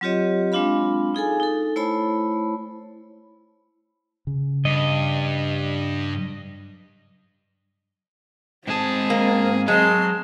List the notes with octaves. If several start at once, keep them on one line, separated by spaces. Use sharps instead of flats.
F#3 C4 F4 G4 C#5 D#5
G#3 C4 D4 F4 F5 B5
D#4 G#4 A4 G#5
D#4 A4
A3 E4 C5 C#5 A5 B5
C#3
G2 D#5
G#2 C4 G#4 A5
A#3
F#3 G#3 A5 C6